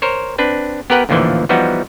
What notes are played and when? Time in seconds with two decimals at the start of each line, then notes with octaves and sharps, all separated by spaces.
0.02 A#4 C5 C#5
0.38 C4 D4 B4
0.90 B3 G4 A#4 B4 F#5 G5
1.09 A1 D#2 A#2 D3 E3 F3
1.49 E3 F3 G3 B3 D#4 F#4